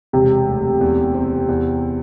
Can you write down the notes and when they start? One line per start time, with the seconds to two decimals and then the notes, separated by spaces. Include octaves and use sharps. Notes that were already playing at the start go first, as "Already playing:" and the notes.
0.13 E1 C3
0.47 D2
0.81 E2
1.14 C4
1.49 E2